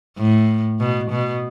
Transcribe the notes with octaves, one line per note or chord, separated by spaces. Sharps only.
A2
B2
B2